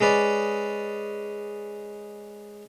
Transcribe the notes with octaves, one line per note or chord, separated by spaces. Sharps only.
G#3 C#4 B4 D5